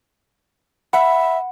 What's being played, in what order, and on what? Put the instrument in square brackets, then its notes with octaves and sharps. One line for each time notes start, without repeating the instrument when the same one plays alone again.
[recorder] E5 [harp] F#5 [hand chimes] B5